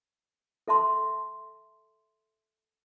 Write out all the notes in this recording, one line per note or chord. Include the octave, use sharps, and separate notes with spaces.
A4 E5 A5 C6